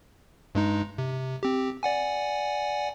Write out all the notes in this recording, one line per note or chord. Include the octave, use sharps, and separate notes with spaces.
G2 G#3 D#4
C3
C4 G4
D5 F#5 G#5